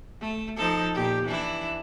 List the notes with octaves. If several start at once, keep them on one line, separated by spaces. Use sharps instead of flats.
A3
F3 D#4 A4
A#2 G4
E3 D4 E4